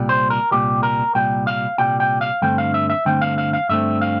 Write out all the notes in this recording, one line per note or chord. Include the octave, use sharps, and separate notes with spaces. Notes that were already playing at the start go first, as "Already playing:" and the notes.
Already playing: C2 A#2 G3
C5
A#4
C2 A#2 G3 G4
A#4
C2 A#2 G3 G5
F5
C2 A#2 G3 G5
G5
F5
G2 D3 A3 C4 G5
F5
E5
E5
G2 D3 A3 C4 G5
F5
F5
F5
G2 D3 A3 C4 E5
F5